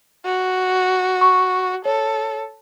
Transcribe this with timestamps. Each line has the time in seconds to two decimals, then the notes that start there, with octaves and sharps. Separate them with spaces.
0.25 F#4
1.21 C#6
1.85 A4 C#5